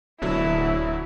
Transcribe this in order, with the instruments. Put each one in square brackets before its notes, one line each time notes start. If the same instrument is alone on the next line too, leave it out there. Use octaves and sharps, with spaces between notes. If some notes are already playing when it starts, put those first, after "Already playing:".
[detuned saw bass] D1 [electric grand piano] B2 D3 F#3 [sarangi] E4